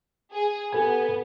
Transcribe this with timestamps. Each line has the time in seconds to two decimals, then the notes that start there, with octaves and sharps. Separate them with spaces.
0.33 G#4
0.73 B3 G4 A4 G#5